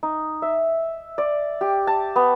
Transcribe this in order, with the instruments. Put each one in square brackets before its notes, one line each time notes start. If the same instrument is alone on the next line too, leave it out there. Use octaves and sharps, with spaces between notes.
[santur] D#4
E5
D5
G4
A5
B3